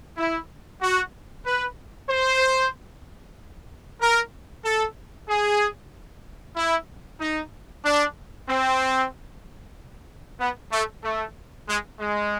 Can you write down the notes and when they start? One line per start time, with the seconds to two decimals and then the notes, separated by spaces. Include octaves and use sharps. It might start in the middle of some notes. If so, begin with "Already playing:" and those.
0.17 E4
0.81 F#4
1.45 B4
2.09 C5
4.01 A#4
4.65 A4
5.29 G#4
6.57 E4
7.21 D#4
7.85 D4
8.48 C4
10.40 B3
10.72 A3
11.04 A3
11.68 G#3
12.00 G#3